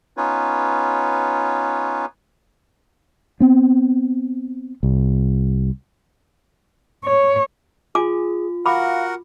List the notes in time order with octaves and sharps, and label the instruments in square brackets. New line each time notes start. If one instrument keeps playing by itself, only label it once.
[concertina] B3 C#4 D#4 F4 B4 C#5
[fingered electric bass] B3 C4
C2
[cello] C#5
[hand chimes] F4 [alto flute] G#4 [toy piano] G#5 D6
[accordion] F#4 A#4 F#5 [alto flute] F5 [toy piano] B5 D6